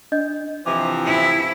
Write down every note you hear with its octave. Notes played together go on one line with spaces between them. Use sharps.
D4 D#5 G6
C3 E3 F3 D6
E4